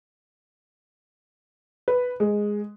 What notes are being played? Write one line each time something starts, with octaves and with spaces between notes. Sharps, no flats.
B4
G#3